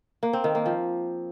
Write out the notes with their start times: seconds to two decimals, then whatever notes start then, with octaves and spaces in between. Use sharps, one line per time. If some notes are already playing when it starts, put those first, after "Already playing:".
0.23 A#3
0.33 C4
0.44 D#3
0.55 A#3
0.66 F3